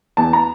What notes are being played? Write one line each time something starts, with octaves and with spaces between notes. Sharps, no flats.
E2 A5
A#5